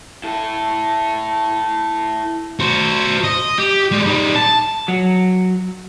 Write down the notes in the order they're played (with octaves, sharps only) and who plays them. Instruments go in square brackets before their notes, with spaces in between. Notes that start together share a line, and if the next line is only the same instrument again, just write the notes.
[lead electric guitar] E4 A4
[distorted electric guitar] F#4 C5
D#5
G4
G3 G#3
G3 D#4
A5
[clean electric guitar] F#3